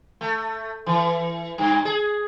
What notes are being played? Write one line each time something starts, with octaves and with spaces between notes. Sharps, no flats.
A3
E3
G2
G#4